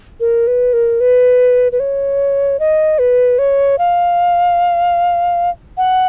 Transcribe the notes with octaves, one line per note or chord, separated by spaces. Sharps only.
A#4
B4
A#4
B4
B4
C#5
D#5
B4
C#5
F5
F#5